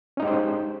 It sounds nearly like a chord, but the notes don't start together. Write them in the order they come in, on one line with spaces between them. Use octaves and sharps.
C#4 D#4 G#3 G4 C5